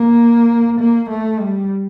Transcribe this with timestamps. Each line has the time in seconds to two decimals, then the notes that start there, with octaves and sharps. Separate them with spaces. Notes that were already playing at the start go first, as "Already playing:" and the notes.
Already playing: A#3
0.80 A#3
1.09 A3
1.40 G3